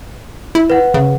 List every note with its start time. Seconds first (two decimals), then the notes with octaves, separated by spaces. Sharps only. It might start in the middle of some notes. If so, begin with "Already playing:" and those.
0.55 E4
0.70 B4 F#5
0.94 C#3